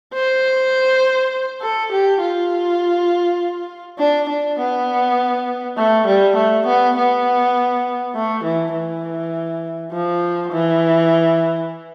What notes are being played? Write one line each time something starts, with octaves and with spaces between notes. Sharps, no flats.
C5
A4
G4
F4
D4
D4
B3
A3
G3
A3
B3
B3
A3
E3
E3
F3
E3